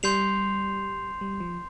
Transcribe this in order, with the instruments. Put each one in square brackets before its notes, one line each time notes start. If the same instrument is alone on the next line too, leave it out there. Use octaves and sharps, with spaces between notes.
[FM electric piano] G3 [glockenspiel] C6 G6 C7 F7
[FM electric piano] G3
F3